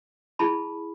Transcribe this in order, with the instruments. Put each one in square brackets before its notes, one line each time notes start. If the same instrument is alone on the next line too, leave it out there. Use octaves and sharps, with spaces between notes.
[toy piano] E4 G#4 A5 B5